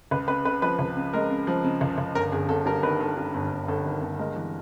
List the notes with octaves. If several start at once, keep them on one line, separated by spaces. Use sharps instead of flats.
C#2 B4
C#3 B4
C#3 B4
F3 B4
C#2
C#3
G#3 A#4
C#3
F3
C#3
C#2
C#2
G1 A#4
G1 G#4
G1 A4
G2 A#4
D#3 B4
D#3 A4
G2
G1
G1
G1 A4
D#3
G1
G#3 A#4
E3